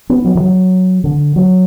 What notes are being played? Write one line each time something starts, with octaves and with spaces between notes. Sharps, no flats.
B3
F#3
E3
F#3
D3
F#3